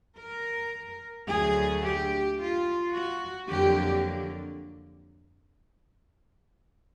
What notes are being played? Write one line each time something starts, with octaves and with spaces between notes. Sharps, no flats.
A#4
D2 D3 F#3 A3 G#4
G4
F4
F#4
F2 D3 F#3 A#3 G4